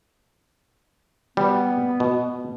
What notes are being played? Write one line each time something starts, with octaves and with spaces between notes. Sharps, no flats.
G3 B3
B2